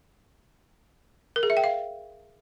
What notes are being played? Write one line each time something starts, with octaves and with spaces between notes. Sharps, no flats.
A#4
G#4
E5
G5
F5